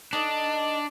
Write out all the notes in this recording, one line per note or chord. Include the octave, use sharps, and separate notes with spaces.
D4 D#4 A4 D#5